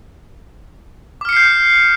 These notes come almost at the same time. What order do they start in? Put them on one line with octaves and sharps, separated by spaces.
D6 F6 C#7 C7 G6